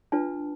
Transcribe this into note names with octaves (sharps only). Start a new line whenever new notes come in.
D4 F4 B4 A5